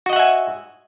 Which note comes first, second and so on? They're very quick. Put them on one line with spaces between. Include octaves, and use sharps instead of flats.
F#4 D#5 F#5 E5 G#5